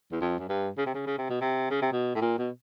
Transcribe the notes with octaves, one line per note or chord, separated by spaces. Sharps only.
E2
F2
F#2
G2
C#3
C3
C#3
C#3
C3
B2
C3
C#3
C3
B2
A2
A#2
B2